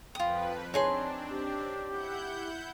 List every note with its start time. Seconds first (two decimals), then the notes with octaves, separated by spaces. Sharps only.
0.15 F2 F3 F4 B4 G5 D#6
0.74 C4 D4 D#4 G#4 C#5 A5 C6
1.30 G4
1.88 E4 F#5 G6